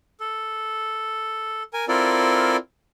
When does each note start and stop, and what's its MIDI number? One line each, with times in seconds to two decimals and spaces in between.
0.20 1.63 69
1.73 1.85 70
1.73 1.85 80
1.88 2.57 60
1.88 2.57 64
1.88 2.57 65
1.88 2.57 69
1.88 2.57 70
1.88 2.57 74